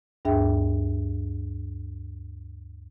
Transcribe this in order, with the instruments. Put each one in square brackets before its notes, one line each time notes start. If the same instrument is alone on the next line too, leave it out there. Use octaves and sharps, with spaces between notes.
[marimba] D2 G2 D4 G#4 E5 G5